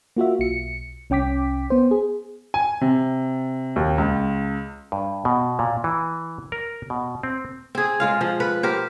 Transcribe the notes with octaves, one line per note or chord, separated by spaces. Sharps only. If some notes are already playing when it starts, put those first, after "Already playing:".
A#3 F4 F#4 E5
B1 C#7
C2 C#4 G5 D6 B6
B3 C5
G#4
G#5
C3
D#2
C#2
G2
B2
A#2
E3
A#4
B2
C4
C4 G#4
G#3 F4 F5
F3
B4
G4 A#4 C5